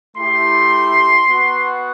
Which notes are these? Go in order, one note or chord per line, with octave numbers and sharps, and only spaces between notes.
A3 E4 G4 C6
B3 F#4